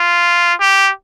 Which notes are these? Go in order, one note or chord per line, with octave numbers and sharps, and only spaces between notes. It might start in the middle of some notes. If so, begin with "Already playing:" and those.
Already playing: F4
G4